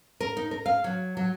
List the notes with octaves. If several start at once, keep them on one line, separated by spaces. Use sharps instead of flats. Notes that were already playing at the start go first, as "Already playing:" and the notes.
A#4
D#4
A#4
F5
F#3
F#3